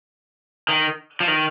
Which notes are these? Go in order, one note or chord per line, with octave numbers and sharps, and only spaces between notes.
D#3
F3
D#3